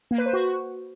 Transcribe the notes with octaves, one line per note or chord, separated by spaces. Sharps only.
A#3
B4
C5
F#4